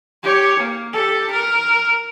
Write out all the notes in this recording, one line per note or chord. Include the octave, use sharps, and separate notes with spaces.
G4 C#5
A#3
G4 A4
A#4